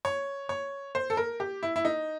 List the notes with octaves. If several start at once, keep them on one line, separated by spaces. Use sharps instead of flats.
C#5
C#5
C5
A4
A#4
G4
E4
E4
D#4